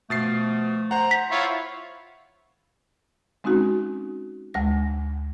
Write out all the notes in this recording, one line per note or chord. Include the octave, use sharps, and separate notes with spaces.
B2 F3 A3 A6 C7
C5 F#5 A#5
B6
E4 F4 C#5
G#3 C4 C#4 D#4 F#4
D2 G#3 A#6